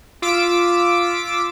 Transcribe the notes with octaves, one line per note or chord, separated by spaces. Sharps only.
F4 D6 E6 B6 D7